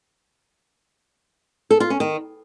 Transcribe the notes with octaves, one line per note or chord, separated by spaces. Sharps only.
A4
F4
C#4
D#3